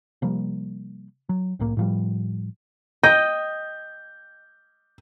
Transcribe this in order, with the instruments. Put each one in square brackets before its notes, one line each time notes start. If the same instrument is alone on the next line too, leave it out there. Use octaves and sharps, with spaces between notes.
[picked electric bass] C3 F3 G3 A#3
F#3
C2 A2 A#3
A2 F3 G3
[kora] D#5 G5 [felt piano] G6